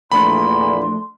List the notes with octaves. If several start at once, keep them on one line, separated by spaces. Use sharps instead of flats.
E2 A#2 F3 A3 D4 B5 C6